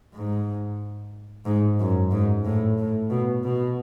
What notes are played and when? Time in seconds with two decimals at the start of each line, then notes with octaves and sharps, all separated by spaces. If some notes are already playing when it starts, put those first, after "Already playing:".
0.14 G#2
1.45 G#2
1.79 F#2
2.11 G#2
2.45 A2
2.78 A2
3.10 B2
3.44 B2